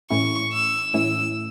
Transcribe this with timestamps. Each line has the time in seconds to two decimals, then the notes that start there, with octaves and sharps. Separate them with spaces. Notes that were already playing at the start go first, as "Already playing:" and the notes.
0.10 A2 E3 A3 C#4 E4 C#6
0.52 E6
0.93 A2 E3 A3 C#4 E4 E6